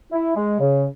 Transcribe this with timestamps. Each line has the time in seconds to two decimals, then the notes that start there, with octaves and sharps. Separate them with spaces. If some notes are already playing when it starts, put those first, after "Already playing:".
0.12 E4
0.36 G#3
0.60 C#3